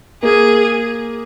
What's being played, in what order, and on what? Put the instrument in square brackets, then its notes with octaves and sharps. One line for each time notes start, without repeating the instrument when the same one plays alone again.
[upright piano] A#3 [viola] G#4